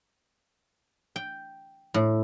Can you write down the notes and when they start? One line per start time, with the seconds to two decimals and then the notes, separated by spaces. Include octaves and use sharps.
1.16 G5
1.94 A2